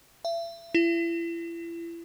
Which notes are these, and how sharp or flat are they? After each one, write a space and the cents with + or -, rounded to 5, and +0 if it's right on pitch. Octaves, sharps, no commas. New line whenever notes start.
E5 +35
E4 +35